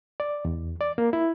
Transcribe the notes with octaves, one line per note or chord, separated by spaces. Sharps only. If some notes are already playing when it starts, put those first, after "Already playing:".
D5
E2
D5
A#3
E4